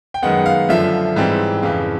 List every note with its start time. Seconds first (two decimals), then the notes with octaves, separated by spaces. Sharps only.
0.14 G5
0.22 F#2 D#3 G#3 B3 F#5
0.46 F5
0.69 F#2 D3 F3 E5
1.16 G#2 E3 G3 C4
1.63 F2 C#3 E3 F5